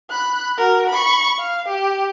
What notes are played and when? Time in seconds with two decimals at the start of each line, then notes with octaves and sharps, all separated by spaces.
0.10 B5 F#6
0.58 F#4 A#4
0.90 B5 C#6
1.38 F5
1.68 G4